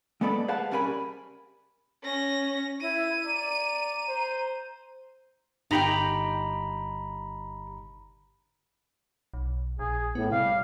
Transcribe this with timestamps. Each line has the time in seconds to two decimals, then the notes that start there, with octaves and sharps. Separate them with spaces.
0.21 G#3 B3 A4 B4 D5 B5
0.48 G#4 B4 C5 F5 F#5 A5
0.71 G3 C#4 A#4 G#5 B5
2.03 C#4 A#6
2.81 E4 D#7
3.25 D5 A#5
4.09 C5
5.71 G1 D#4 G4 G5 A#5 B5
9.34 B1
9.79 A#1 G#4
10.15 A2 B3
10.32 C3 G3 F5